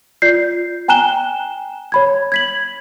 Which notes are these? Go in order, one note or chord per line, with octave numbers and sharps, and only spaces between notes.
F4 D5 G6 C7
G5 G#5 A#5 F#6 E7 G7
C#5 B5 G#6
G#6 B6 F#7